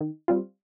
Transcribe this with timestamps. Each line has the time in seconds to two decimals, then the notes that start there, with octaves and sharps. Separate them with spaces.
0.01 D#3
0.28 G3 C4 F4